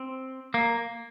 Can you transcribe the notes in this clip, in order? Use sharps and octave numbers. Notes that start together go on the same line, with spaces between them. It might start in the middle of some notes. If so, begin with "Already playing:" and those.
Already playing: C4
A#3